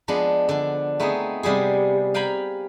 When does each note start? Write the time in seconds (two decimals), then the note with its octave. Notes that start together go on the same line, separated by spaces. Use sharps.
0.08 F3 G#3 B3 D4
0.49 D3 D4
1.00 A3 B3 C4 D#4 G#4
1.43 C3 G3 B3 G#4
2.14 F5 G5 G#5 A#5 B5